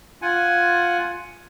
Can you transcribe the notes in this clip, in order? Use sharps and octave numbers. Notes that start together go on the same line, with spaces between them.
F4 F#5 G#5